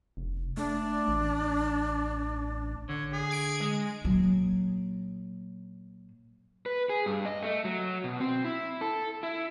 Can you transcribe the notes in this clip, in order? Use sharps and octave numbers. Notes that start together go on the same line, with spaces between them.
F1
A3 D4
A1
D3 C#5
G#4
G#6 D7
G#3
A#2 F#3
B4
G#4
G2
D#5
A3
F#3
B2
C4
E4
A4
E4